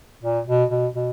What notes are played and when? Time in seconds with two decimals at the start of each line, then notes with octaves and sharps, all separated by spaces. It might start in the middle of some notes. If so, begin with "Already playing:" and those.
0.23 A#2
0.47 B2
0.70 B2
0.95 B2